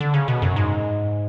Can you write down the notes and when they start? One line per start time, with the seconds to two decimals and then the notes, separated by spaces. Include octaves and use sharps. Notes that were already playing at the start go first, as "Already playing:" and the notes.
0.01 D3
0.14 C#3
0.28 B2
0.42 F#2
0.56 G#2